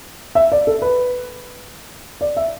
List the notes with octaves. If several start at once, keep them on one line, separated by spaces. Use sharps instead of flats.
E5
D5
A4
B4
D5
E5